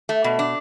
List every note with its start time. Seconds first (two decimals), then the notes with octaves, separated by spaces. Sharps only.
0.09 A3
0.24 B2
0.39 D4